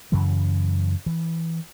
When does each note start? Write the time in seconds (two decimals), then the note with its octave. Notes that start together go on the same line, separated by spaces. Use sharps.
0.12 F#2 C#3 E3 F#3
1.06 E3